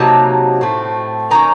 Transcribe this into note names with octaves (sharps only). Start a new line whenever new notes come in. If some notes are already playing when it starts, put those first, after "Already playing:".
Already playing: C3 F#3 A#3 D#4 A5
A2 A3 C4
D#3 A#3 C#4 A#5